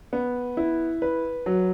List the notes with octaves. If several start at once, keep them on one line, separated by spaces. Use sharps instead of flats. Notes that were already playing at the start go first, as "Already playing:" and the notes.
B3
E4
B4
F#3